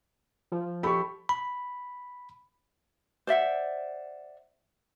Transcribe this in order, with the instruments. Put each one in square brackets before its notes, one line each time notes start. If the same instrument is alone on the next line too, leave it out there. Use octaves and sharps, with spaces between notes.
[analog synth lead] F3
[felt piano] G4 A4 [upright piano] B5 C#6
[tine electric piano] B5
[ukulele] C5 D5 E5 F#5